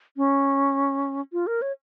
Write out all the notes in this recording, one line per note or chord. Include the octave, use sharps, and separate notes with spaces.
C#4
F4
A#4
C#5